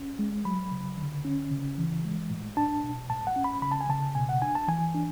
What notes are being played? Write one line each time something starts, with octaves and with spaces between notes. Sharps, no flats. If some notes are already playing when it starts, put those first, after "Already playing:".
Already playing: C#4
G#3
F#3 B5
C#3
D3
C#4
C#3
E3
G#3
A2
D4 A5
B2
A2 A5
F#5
C#4
B5
C#3 B5
A5
G#5
C#3 A5
B2 G#5
F#5
D4 G#5
A5
E3 G#5
D4